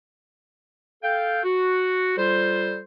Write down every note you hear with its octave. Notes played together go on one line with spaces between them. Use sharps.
A4 F5 G5
F#4
G3 F4 A4 C5